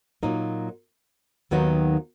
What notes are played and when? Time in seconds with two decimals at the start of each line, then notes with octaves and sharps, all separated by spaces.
0.23 A#2 F#3 A#3 D#4
1.51 D#2 D#3 F#3 B3 D#4